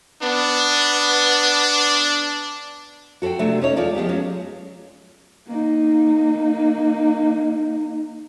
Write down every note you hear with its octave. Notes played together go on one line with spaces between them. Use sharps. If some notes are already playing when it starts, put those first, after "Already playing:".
B3 D4
F#4 A4 B4 C5 G5
C3 F#3 A3 C4 D4
C#4 D#4 A4 C#5
E2 G#3 F4 A4 D5
F3 G#3 B3 G4
F#3 C#4
A#3 D#4